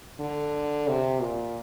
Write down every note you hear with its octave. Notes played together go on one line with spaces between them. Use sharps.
D3
C3
A#2